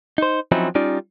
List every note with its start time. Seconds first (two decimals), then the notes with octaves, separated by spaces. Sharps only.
0.18 D#4 C5
0.52 F3 F#3 C4 C#4 D#4 E4
0.75 G3 C#4 D#4 F4 D5